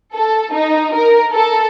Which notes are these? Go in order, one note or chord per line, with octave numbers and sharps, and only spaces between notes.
A4
D#4
A#4
A4